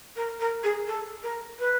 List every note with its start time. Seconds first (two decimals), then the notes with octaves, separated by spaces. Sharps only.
0.16 A#4
0.40 A#4
0.63 G#4
0.87 A4
1.23 A#4
1.59 B4